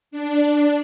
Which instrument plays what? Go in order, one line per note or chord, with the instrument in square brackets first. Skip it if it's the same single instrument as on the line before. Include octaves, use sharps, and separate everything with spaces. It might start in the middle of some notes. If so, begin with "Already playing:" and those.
[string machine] D4